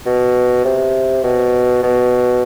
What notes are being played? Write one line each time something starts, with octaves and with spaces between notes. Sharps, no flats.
B2
C3
B2
B2